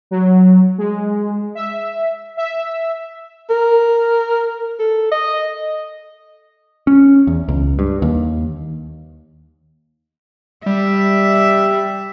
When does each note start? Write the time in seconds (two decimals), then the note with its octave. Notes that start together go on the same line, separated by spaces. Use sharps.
0.11 F#3
0.78 G#3
1.55 E5
2.37 E5
3.50 A#4
4.79 A4
5.11 D#5
6.87 C#4
7.27 E2
7.48 C#2
7.79 G2
8.02 D#2
10.66 G3 E5